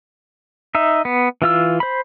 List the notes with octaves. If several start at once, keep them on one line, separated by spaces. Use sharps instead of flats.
D#4 E5
B3
E3 F4 E6
C5 B5